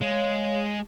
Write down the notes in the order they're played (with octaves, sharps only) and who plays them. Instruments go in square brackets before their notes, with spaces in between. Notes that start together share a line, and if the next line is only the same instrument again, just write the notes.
[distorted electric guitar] G#3 [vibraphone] C#5 F5